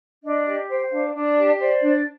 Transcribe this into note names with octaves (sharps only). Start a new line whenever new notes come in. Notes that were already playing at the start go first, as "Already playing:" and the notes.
D4 D#5
G4 D#5
C5 G5
D4 F5
D4 D5
G4
C5 D5
D4